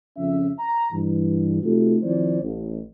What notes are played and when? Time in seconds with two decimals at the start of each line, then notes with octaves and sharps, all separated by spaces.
0.17 F2 C#3 F3 C#4 E5
0.59 A#5
0.92 G2 E3
1.62 C3 A3 D#4 F4 F#4 A4
2.03 D#3 F3 C4 E4 C5 D5
2.42 A1